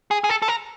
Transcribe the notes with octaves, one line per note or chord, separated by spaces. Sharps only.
G#4
G#4
A4
A4
A#4